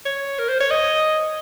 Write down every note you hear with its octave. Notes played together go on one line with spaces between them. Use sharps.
C#5
A#4
C5
C#5
D#5